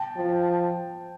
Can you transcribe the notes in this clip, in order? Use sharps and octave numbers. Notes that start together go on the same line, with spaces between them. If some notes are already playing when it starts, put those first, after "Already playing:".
Already playing: G5 A5
F3